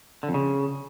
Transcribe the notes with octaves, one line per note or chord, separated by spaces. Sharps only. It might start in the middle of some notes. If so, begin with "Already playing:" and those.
D3
F2
C#3